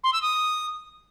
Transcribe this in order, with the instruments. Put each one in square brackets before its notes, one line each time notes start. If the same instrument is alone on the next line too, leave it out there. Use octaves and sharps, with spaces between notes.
[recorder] C6
E6
D#6